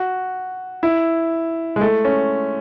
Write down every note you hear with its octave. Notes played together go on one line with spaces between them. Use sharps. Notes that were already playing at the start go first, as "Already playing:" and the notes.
Already playing: F#4
E4
G#3
A3
C#4